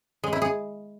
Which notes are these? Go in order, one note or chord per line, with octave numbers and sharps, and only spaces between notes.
G#3
E4
G#4